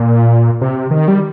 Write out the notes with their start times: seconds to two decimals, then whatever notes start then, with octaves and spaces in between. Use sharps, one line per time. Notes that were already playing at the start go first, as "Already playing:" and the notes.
Already playing: A#2
0.61 C3
0.91 D#3
1.08 G3